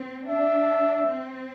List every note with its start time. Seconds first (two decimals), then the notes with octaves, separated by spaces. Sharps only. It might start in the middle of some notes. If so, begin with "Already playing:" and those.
Already playing: C4
0.28 D4 E5
1.08 C4